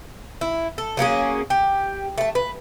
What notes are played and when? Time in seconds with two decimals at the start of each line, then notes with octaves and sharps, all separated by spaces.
0.41 E4
0.78 A4
0.97 F#3 A#3 C#4 G#4
1.50 G4
2.18 A3 A5
2.35 B4